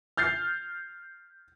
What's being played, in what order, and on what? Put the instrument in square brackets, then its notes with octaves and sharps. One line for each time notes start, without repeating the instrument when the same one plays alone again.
[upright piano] F6 G6 A6 C7